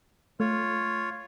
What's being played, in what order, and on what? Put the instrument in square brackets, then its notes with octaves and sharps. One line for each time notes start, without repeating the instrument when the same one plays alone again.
[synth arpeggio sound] A3 [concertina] F4 C#5